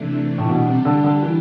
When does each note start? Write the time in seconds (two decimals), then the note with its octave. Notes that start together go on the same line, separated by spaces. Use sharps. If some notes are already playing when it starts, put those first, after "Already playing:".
Already playing: C3 E3 A3 D4
0.38 A2
0.49 B2 G3 D4 G4
0.68 C3
0.85 D3
1.04 D3
1.23 E3